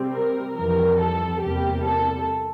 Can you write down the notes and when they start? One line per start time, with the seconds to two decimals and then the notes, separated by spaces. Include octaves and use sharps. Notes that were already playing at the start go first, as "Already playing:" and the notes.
Already playing: C3 G3 C4
0.13 A#4
0.55 F2 E3 G3 A#4
0.98 A4
1.40 E2 C3 G3 A#3 G4
1.84 A4